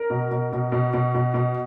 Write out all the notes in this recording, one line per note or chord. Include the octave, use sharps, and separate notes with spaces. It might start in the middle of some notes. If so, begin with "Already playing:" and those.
Already playing: A#4
B2
B2
B2
B2
B2
B2
B2